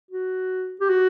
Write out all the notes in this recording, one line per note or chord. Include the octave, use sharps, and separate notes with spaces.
F#4
G4
F#4